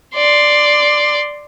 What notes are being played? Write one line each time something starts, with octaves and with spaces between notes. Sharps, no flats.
D5 C6